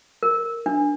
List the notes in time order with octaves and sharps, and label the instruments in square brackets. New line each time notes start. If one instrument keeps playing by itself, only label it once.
[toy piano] A#4
D4